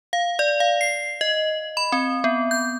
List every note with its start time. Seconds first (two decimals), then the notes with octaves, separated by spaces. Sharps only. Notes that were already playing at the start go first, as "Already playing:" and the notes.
0.13 F5
0.39 D5
0.60 F5
0.81 C7
1.21 D#5
1.77 B5
1.92 C4
2.24 B3
2.51 G6